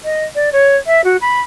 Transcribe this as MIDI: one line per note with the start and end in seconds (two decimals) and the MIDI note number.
0.04 0.24 75
0.35 0.49 74
0.52 0.76 73
0.86 1.01 76
1.04 1.17 66
1.21 1.41 83